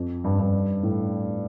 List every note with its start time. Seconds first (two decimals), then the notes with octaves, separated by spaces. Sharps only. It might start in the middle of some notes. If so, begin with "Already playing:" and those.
Already playing: F2
0.24 G2
0.39 G2
0.83 A2